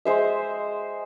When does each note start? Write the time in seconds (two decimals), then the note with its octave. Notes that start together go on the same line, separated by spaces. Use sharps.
0.05 G#3 C5 E5